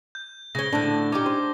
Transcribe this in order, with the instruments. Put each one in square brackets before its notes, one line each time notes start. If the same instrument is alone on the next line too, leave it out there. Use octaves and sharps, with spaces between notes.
[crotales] G6
[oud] C#3 C#4 [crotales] A#6 G7
[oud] A2 D3 [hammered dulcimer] D4
[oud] C#4 D#4 G4 [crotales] D6
[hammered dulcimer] C5